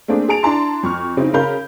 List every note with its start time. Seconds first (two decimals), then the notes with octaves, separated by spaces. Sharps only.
0.08 A3 A#3 C4 D4 G#4
0.28 G#4 G#5 A5 D7 F7
0.43 D4 E4 A5 A#5 C6
0.83 F2 C#6 F6
1.17 C#3 C4 D#4 E4
1.33 C#3 A#4 F5 B5 G6